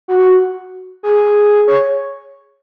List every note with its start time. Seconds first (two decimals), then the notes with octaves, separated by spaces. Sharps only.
0.08 F#4
0.19 F#4
1.03 G#4
1.68 C#5